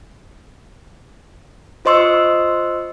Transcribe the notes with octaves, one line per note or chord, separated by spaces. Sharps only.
F4 C5 D#5 C6 C#6 E6